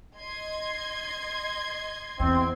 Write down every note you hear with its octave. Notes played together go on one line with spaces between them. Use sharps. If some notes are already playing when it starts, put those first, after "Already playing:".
D#5 C6 G#6
E2 C4